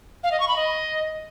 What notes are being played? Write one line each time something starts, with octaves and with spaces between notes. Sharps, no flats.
F5
D#5
C#6
B5
D#5